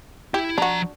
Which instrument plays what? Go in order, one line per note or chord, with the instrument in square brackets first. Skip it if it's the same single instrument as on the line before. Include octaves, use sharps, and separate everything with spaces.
[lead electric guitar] E4 [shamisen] G4
[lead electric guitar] F3 A#5 [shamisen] D4 F#4